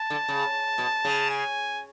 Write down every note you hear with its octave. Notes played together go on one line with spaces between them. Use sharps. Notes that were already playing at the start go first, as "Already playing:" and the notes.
Already playing: A5
D3
C#3
B2
C#3
G#5